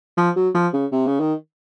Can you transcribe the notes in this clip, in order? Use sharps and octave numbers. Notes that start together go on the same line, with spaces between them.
F3
F#3
F3
C#3
C3
C#3
D#3